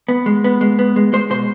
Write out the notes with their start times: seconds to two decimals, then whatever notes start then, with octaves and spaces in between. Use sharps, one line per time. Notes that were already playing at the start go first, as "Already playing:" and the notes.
0.08 B3
0.26 G#3
0.44 B3
0.61 G#3
0.79 B3
0.96 G#3
1.13 G#3 C5
1.30 B2 C5